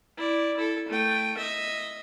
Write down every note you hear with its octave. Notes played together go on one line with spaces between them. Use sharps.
E4 D5
E4 A4
A3 G5
D#5 E5